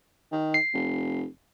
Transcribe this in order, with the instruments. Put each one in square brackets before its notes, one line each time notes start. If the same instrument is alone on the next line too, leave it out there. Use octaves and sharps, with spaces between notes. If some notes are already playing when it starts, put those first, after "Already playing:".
[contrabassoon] D#3
[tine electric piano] C7
[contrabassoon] F1